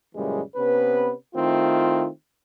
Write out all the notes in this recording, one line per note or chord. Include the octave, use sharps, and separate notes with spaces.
F#2 A#2 C#3 E3 G3 G#3
C3 B3 C#4 B4
D#3 A3 C4 E4 F4